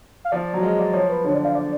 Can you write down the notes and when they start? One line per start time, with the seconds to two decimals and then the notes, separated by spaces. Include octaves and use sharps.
0.25 F5
0.32 F3 D5
0.54 F#3
0.63 G#3 F5
0.79 D5
0.93 F3 C#5
1.09 B4
1.25 D3 C#5
1.35 D5
1.45 F5
1.55 D5